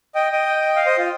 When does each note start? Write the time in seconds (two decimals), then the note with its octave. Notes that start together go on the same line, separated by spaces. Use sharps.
0.15 D#5 G5
0.32 D#5 G5
0.76 F5
0.86 C5 D#5
0.98 F4